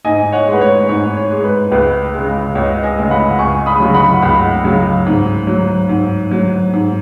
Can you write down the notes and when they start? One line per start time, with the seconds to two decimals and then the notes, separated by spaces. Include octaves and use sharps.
0.05 G#2 D#5 G#5
0.32 C#5 F#5
0.47 G#3
0.53 B4
0.61 C#5
0.89 G#2 C#5
1.16 C#5
1.31 G#3
1.44 B4
1.72 C#2 B4
2.14 C#3 G#3
2.55 C#2 C#5
2.63 D#5
2.71 C#5
2.83 D#5 G#5
2.98 C#3 G#3
3.11 F#5 B5
3.39 C#2 G#5 C#6
3.66 B5 D#6
3.80 C#3 F#3
3.94 F#5 B5
4.22 C#2 F#5 B5
4.64 C#3 F#3
5.06 G#2
5.47 F#3
5.89 G#2
6.31 F#3
6.73 G#2